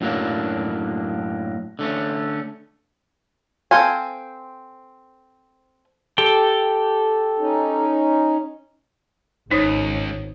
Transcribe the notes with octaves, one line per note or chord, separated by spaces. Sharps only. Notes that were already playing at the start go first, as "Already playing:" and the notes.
F#2 A2 F#3 A#3 D4
D3 A3 C#4
C4 A4 C5 F5 G#5
G4 A4 G5
C#4 D#4
G#1 C#2 D#4 C5 C#5 D#6